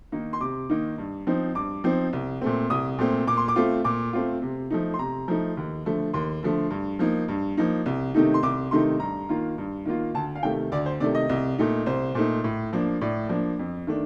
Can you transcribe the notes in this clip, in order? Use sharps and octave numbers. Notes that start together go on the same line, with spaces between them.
D#3 A#3 D#4
C6
C3 D6
D#3 A#3 D#4
G2
F3 C4 D#4
G2 D6
F3 C4 D#4
C2
A#2 A3 C4
C2 D#6
A#2 A3 C4
A#2 D6
C6
D6
A3 C4 F4
A#2 D6
A3 C4 F4
C3
F3 A3 D#4
C6
C3 A#5
F3 A3 D#4
D#2
D3 F3 A3
D#2 C6
D3 F3 A3
G2
F3 A#3 D#4
G2
F3 A#3 D#4
C2
C3 D#3 A3 D#4
C6
C2 D6
C3 D#3 A3 D#4 C6
G2 A#5
D#3 A#3 F4
G2
D#3 A#3 F4
D2 A5
F5
C3 D#3 A3 G5
D2 D5
C5
C3 D#3 A3 D5
D#5
C2
A#2 A3 D#4
C2 C5
A#2 A3 D#4
A2
F3 A#3 D4
A2 D5
F3 A#3 D4
F2
D#3 A3 D4